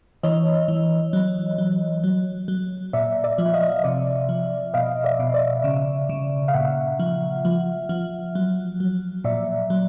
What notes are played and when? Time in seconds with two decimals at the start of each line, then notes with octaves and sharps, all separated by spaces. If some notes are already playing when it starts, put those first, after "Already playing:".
0.23 E3 C#5 D#5
0.68 E3
1.13 F#3
1.58 F#3
2.04 F#3
2.48 F#3
2.93 A#2 D5 E5
3.24 D5 E5
3.38 F3
3.54 D#5 F5
3.84 C3 D5 E5
4.29 F3
4.74 B2 D#5 F5
5.04 D5 E5
5.19 B2
5.34 D5 E5
5.64 C#3
6.09 C#3
6.48 F5
6.54 A#2 E5 F#5
6.99 F3
7.45 F3
7.89 F3
8.35 F#3
8.80 F#3
9.24 A#2 D5 E5
9.70 F#3